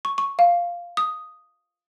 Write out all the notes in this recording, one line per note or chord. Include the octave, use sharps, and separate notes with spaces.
C#6
C#6
F5
D#6